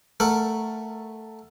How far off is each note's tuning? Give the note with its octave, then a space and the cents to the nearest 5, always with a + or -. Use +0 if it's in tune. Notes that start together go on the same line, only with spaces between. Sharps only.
A3 +0 A#4 -15 F#5 +0